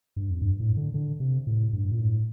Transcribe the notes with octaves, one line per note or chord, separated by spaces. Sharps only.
G2
F2
G2
A2
D3
D3
C3
A2
G2
A#2
A2